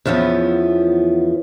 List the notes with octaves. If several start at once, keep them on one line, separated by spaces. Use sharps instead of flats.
E2 E3 F3 B3 C#4